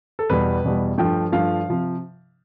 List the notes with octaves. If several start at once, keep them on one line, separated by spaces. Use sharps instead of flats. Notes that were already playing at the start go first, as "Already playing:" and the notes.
A4
E2 B2 G3 B4
E2 B2 G3
G2 F3 A3 G5
G2 F3 A3 F5
C3 F3